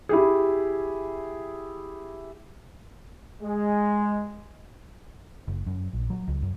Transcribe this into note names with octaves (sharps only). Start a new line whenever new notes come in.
E4 G4 G#4
G#3
F#1
F#2
A#1
F#3
C#2
F#2